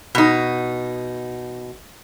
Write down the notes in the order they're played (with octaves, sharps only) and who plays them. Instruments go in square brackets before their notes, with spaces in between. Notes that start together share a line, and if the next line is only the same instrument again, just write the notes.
[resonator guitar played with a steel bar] B2 D#4